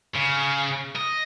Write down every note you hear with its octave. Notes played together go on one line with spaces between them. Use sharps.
C#3
D#5